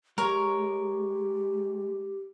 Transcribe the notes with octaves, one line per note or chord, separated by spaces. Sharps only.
G#3 G4 A#4 C#5